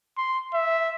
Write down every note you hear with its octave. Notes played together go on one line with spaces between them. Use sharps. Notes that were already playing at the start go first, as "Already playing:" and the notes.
C6
E5